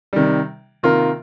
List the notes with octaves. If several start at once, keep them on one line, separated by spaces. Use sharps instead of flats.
C3 D#3 G3
C3 D#3 A#3 F4 A#4